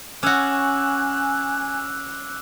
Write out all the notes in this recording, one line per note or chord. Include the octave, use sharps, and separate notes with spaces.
C#4 F#4 G#5 D6 E6 F#6